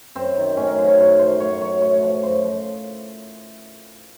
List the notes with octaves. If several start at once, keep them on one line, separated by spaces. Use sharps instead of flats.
F#2 C4
D#3
A2 C#4
A#4
F#3 C5
C#5
F#2 C5
F3 C5
A2 C#5
F#3 C#5
A2 C#5
F3
F#2 C5
F3